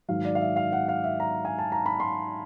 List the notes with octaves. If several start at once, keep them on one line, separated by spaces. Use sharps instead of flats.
G#2 D#3 F#3 F5
D5
F5
E5
F5
F#5
F5
E5
A#5
G#5
A5
A#5
B5
C6